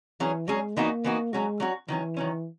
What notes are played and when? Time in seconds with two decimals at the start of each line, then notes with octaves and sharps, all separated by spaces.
0.20 E3 F#3 C#4 G#4
0.48 F#3 G#3 C#4 G#4
0.76 E3 A#3 B3 D#4 F#4
1.04 E3 B3 D#4 F#4
1.33 F#3 G#3 C#4 F#4
1.60 F#3 C#4 F#4
1.88 D#3 E3 F#3 C#4
2.17 D#3 F#3 C#4